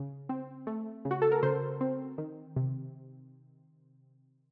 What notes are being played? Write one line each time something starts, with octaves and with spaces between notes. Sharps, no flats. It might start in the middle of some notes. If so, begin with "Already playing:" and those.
Already playing: C#3
C4
A3
C#3
F#4
A4
A#4
C#3 C5
C4
D#3
C3